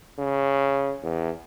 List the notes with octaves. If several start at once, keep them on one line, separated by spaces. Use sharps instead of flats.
C#3
E2